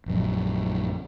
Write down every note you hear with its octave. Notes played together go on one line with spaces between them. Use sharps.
A#1 F#2